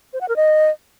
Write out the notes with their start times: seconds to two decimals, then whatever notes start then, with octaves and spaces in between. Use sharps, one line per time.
0.13 C5
0.21 F#5
0.29 A#4
0.36 D#5